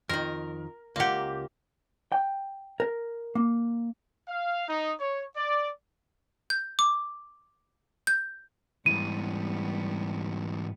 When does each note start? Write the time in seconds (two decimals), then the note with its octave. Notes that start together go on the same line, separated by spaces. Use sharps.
0.09 F2 D#3 A#4
0.96 C#2 A#3 G4 F#5
2.12 G5
2.80 A#4
3.35 A#3
4.28 F5
4.68 D#4
5.00 C#5
5.36 D5
6.50 G6
6.79 D6
8.07 G6
8.86 G#2 E3 G3 B3 D#7